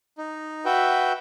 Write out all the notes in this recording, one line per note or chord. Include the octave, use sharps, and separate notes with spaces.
D#4
F#4 B4 E5 G5